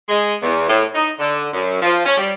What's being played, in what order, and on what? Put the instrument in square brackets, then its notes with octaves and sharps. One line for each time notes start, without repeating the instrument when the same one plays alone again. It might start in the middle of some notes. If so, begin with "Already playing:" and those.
[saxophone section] G#3
E2
A2
D#4
D3
F#2
F3
C#4
G3